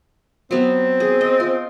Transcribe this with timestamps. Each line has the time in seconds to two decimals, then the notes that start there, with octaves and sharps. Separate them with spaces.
0.51 F#3 B3 C4
1.00 G#4
1.21 D#5
1.40 F4